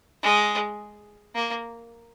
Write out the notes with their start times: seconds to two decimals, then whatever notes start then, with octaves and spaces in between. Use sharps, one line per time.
0.22 G#3
1.35 A#3